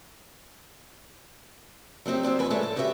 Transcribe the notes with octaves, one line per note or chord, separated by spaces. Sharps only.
F#3 G3 C4 D#4 G4
D3 F#3 C4 D4
F2 D3 B4 G#5
A2 G#3 A3 G#4 A4 C#5
A4
F#4 G4 B4 C#5 D#5 E5